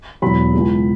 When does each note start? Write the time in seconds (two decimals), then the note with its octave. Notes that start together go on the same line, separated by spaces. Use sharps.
0.22 E1 E2 B2 F#3 B5
0.53 C#2 C#3 E3 G#3